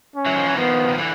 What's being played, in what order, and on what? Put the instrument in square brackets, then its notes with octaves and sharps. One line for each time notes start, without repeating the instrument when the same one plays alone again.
[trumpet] C#4
[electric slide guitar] E3 F#3
D#3 F3
E3 F#3
[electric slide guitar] D#3 F3 [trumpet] B3
[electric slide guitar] D#3
D3 E3